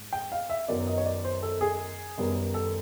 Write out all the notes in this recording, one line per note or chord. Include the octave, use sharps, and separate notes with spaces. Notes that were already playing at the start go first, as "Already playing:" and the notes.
Already playing: G#2
G5
F5
E5
F#2 D#3 F#3 B3 D5
D#5
C#5
D5
C5
A4
G#4
F#2 D#3 G3 B3
A4